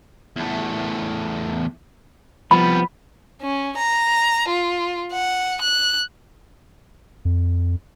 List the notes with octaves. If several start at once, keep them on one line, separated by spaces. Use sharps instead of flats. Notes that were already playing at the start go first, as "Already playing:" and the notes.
E2 A3
C2 F3 G3 B3 B5
C#4
A#5
F4
F#5
F#6
F2